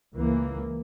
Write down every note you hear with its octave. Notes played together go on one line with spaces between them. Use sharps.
C#2 E3 A#3